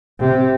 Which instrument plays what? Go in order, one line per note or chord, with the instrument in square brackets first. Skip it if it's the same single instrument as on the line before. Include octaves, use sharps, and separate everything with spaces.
[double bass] C3